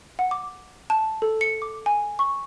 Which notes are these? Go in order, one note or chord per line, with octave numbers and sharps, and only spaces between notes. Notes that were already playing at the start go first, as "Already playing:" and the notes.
F#5
D6
A5
A4
C#7
D6
G#5
C#6